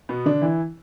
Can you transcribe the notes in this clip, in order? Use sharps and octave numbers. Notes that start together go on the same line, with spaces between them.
B2 B3
D3 D4
E3 E4